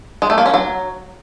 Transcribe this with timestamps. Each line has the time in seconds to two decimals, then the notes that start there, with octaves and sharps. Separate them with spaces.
0.22 G#3
0.30 A3
0.38 A#3
0.46 C#4
0.54 F#3